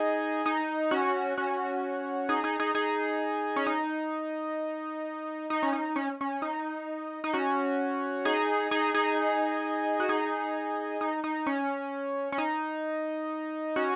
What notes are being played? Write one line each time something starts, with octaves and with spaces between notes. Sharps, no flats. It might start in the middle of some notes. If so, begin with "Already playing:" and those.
Already playing: D#4 G#4
D#4
C#4 F#4
C#4 F#4
D#4 G#4
D#4 G#4
D#4 G#4
D#4 G#4
C#4
D#4
D#4
C#4
D#4
C#4
C#4
D#4
D#4
C#4 F#4
D#4 G#4
D#4 G#4
D#4 G#4
F#4
D#4 G#4
D#4
D#4
C#4
C#4
D#4
C#4 F#4